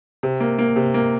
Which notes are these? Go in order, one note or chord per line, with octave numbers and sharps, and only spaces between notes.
C3
A#3
A#3
C3
A#3